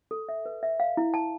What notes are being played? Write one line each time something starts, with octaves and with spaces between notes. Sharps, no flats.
A4
E5
B4
E5
F5
E4
A5